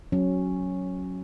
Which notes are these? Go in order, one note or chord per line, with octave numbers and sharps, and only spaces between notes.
F#3 C#4